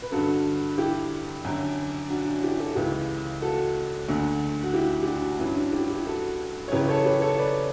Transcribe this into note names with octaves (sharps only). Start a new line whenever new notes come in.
B4
G2 D3 F#4 A4
E4 G4
F#2 D3
D4 F#4
D4 F#4
E4 G4
F#4 A4
C#2 C#3 E3 G4 B4
F#4 A4
D2 D3
F#4
E4 G4
G4
D4 F#4
G2 E3 C#4 E4
D4 F#4
E4 G4
E4 G4
F#4 A4
C#5
F#2 C#3 E3 G4 B4
A4 C#5
G4 B4
A4 C#5
B4 D5